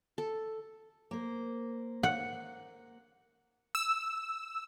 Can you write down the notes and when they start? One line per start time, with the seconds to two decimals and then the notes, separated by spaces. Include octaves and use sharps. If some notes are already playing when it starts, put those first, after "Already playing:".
0.18 A4
1.11 A#3 C5
2.03 F#5
3.75 E6